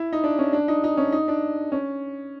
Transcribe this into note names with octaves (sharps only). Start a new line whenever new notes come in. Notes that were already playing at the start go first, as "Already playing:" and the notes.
Already playing: E4
D#4
D4
C#4
D4
D#4
D#4
C#4
D#4
D4
C#4